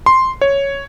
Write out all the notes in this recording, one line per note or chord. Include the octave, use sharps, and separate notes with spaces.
C6
C#5